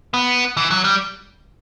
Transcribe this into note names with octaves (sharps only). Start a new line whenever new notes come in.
B3
E3
F#3
G3